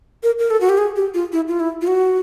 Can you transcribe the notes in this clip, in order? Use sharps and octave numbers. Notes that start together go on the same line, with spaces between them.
A#4
A#4
A4
F#4
G4
G#4
G4
F4
E4
F4
E4
F4
F#4